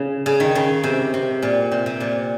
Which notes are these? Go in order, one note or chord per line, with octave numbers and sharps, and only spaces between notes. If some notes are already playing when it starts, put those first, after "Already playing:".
Already playing: C#3
C#3
D#3
C#3
C3
C3
A#2
C3
C3
A#2